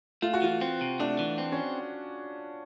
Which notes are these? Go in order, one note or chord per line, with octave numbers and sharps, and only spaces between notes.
A3 F4
F#4
E3 F4
C4
C3
A3 D4
E3
C4
C#4